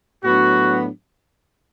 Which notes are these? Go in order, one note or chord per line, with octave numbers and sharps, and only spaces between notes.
A2 F#3 B3 D4 F#4